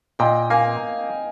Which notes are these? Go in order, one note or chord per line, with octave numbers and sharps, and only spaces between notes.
A#2 D#5 G5
A#3 F5 G#5